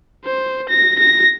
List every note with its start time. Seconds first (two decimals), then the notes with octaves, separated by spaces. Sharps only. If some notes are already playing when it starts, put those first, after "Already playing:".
0.25 C5
0.69 A#6
0.99 A#6